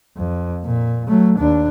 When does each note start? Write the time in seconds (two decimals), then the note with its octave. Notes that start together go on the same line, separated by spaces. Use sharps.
0.17 F2
0.65 A#2
1.08 F#3 A3
1.39 D#2 D4